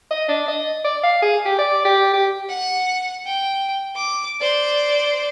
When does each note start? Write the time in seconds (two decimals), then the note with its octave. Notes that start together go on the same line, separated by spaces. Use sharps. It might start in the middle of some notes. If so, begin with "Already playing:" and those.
0.11 D#5
0.28 D4
0.48 D#5
0.85 D5
1.04 F5
1.22 G#4
1.45 G4
1.59 D5
1.85 G4
2.14 G4
2.49 F#5
3.26 G5
3.96 D6
4.40 C5 D5